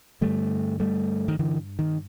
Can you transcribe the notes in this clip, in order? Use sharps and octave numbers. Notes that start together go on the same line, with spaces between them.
G2 D3 G3 A3
G3 A3
D#3
D3 E3
D#3